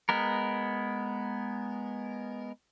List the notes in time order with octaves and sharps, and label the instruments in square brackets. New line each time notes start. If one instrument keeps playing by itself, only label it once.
[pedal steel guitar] G#3 B3 A#4